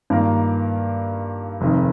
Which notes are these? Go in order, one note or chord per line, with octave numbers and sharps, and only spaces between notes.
G2 D#3 A#3 F4 A#4
F1 F2 D#3